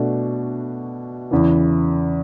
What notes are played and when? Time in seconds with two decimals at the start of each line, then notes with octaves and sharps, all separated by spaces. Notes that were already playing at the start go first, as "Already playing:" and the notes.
Already playing: B2 A3 D4 F#4
1.31 E2 C#3 E3